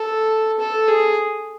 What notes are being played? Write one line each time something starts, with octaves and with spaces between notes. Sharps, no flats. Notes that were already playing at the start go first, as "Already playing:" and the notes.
Already playing: A4
A4
G#4